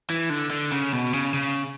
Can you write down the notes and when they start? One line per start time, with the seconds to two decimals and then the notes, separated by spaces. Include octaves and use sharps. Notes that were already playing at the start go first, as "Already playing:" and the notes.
0.10 E3
0.30 D3
0.50 D3
0.72 C#3
0.93 B2
1.14 C#3
1.34 C#3